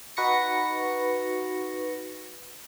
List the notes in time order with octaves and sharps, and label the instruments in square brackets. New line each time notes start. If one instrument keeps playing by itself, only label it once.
[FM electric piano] D#4 F#4 B4 C#6 A#6 C#7